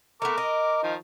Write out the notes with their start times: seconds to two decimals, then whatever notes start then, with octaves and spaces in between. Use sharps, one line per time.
0.22 A3 B3 A#4 D6
0.38 D#5
0.83 D#3 F3